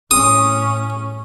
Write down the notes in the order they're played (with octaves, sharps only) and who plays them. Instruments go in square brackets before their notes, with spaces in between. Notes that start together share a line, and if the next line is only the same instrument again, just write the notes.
[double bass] A2 C#4 [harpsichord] D#6